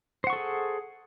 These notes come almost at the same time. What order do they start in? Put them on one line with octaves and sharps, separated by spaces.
C5 F#5 C#6 A4 G#4